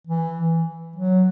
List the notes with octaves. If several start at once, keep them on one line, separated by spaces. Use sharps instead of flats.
E3
F#3